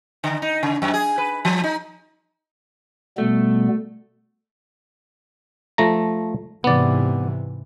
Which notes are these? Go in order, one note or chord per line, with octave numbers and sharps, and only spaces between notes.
D3
D#4
C#3
F#2
G#4
B4
F3
D#4
B2 G3 A3 B3
F3 A3 A#5
G#2 C3 E3 B3 D5